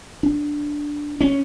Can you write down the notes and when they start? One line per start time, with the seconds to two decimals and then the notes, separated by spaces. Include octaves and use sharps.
0.23 D4
1.21 C#4